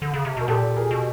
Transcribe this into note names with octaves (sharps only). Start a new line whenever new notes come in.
D3
C#3
C3
B2 A#4
A#2 G4 A4
G#4 A#4
B2